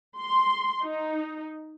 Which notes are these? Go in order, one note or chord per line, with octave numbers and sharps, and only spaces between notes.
C6
D#4